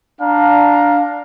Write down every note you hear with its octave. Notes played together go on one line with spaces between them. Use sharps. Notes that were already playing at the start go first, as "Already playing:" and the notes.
D4 F5 A#5